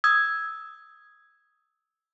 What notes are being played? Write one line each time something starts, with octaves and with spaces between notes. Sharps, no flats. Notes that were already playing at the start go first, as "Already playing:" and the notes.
D#6 E6 G#6